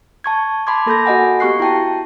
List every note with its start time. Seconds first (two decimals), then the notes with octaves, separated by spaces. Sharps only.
0.24 A5 C#6 G#6
0.67 A5 B5 C6 D6 G#6
0.86 A#3 A4 B5 G6 A#6
1.05 F#4 D#5 F#5 G#5
1.40 B3 G4 C#6 F#6 C7
1.60 E4 F#4 G5 A5